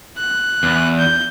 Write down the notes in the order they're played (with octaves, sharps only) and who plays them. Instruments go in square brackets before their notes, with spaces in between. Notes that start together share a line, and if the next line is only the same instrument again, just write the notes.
[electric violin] F#6
[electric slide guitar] E2
[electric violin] G6